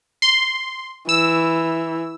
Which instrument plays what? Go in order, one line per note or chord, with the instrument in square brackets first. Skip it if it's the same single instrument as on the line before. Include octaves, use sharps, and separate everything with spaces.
[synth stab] C6
[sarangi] E3 [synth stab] E6